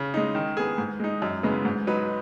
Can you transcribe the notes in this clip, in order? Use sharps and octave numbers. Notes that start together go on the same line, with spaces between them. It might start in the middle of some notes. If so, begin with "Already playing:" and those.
Already playing: C#3
G#3 D#4
D#3
B3 G#4
G#2
G#3 D#4
F#2
C#3 G#3 B3
G#2
F#3 D#4 B4